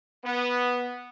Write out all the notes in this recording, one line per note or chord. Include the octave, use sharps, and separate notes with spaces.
B3